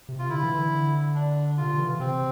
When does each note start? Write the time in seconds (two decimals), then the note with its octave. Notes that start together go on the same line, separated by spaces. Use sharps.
0.09 C3
0.19 F4
0.29 D3 E4
0.43 E3
0.58 D3
1.15 D4
1.57 C3 F4
1.68 D3
1.79 E3
1.89 C3
2.00 C3 C4